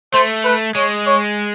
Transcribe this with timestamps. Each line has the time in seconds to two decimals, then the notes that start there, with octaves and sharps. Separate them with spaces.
0.13 A3 C5
0.45 B4
0.75 G#3 C#5
1.07 C#5